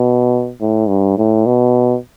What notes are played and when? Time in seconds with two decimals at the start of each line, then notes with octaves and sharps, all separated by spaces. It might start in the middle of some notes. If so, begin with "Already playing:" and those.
Already playing: B2
0.61 A2
0.89 G2
1.18 A2
1.46 B2